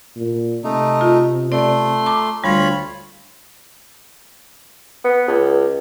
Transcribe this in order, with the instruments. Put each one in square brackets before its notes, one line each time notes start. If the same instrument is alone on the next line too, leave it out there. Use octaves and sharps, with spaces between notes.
[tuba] A#2
[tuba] C3 [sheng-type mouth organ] A3 D#4
[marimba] F4
[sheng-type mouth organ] A3 C6 [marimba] D5
[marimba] A5 A#5 D6
[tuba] D2 [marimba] G3 [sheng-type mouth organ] F4 C#5 B5
[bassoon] B3
C#2